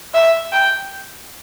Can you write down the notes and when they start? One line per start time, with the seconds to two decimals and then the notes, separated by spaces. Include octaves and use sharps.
0.14 E5
0.52 G5